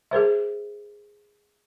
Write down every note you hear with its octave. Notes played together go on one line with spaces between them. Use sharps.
G#4 A#4 C5 E5